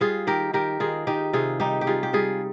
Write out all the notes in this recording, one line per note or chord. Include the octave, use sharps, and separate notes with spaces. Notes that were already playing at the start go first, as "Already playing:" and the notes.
G3 F4 G#4
D#3 G4 A#4
D#3 G4 A#4
D#3 F4 G#4
D#3 D#4 G4
C3 F4 G#4
G3 D#4 G4
G4
G3 F4 G#4
G4
G3 F4 G#4